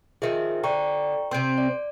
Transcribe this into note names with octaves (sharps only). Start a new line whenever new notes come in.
D#3 F3 G#4 E5
D3 G5 A#5 C#6
C3 C4 C6 G6 D7
D5